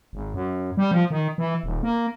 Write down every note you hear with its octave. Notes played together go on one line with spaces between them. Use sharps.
G#1
F#2
G3
F3
D#3
E3
D#1
A#3